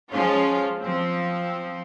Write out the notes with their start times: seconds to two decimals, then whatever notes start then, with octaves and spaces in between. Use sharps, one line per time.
0.11 F3 G#3 C#4 F4
0.81 F3 C4